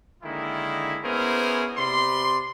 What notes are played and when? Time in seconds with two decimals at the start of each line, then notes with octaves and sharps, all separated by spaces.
0.23 D3 D#3 G#3 A#3 E4
1.03 B3 C#4 E4 G#4 A#4 C5
1.78 C3 D5 B5 C6